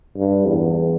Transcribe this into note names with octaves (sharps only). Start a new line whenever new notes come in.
G2
E2